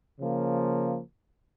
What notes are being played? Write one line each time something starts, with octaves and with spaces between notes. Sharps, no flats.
C#3 F3 A#3